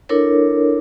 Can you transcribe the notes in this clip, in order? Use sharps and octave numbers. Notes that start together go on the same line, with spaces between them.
D4 E4 A4 A#4 C#5